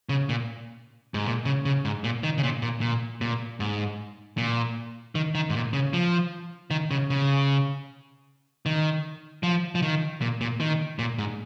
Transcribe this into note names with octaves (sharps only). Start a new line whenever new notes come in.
C#3
A#2
G#2
A#2
C#3
C#3
G#2
A#2
D#3
C#3
A#2
A#2
A#2
A#2
G#2
A#2
D#3
D#3
G#2
A#2
C#3
F3
D#3
C#3
C#3
D#3
F3
F3
D#3
A#2
A#2
D#3
A#2
G#2